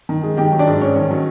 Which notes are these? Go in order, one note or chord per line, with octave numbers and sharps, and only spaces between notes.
D#3
G#3
D#3 G4 G5
F#3
D4 D5
G#2
G#2 C#4 C#5
D#3
F#3